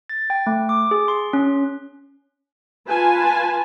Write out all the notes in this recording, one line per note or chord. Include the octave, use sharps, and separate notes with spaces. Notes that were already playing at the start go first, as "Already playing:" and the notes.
A6
G5
A3
D6
G#4
C6
C#4
F4 B4 G#5 A5